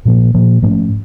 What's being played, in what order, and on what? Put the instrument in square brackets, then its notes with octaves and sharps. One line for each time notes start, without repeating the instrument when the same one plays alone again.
[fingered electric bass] A#2 F3 A#3
A#2 F3 A#3
G#2 F3 A3 C#4